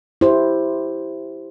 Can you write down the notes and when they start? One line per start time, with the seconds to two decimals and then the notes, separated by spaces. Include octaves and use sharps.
0.21 E4 G4 C5